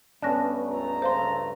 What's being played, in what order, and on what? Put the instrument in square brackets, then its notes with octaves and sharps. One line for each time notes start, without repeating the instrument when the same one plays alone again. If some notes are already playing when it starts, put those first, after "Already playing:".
[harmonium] G2 A3 [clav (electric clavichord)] B3 C#4 D4 [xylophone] A5 F#6 A#6
[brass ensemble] C#2 A4 A#5
[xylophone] C5 F5 C6